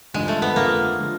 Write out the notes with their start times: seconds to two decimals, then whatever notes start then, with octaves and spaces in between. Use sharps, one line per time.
0.14 G#1 G2 D3 F3 G#3
0.28 A3
0.42 B3
0.56 F2 D3 F3 G#3 A#3
0.98 D3 F3 G#3